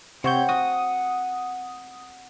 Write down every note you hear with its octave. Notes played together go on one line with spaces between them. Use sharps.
C3 C4 C#5 F#5 G6
F#4 D#6